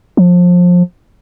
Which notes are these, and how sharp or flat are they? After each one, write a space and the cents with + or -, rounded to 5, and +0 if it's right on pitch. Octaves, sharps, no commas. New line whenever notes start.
F3 +25